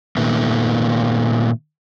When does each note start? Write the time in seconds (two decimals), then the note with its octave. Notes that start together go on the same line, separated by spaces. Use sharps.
0.17 A#2 D#3 A3 B3